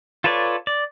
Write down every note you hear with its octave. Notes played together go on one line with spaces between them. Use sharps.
F4 A4 B4 C#5 D5
D5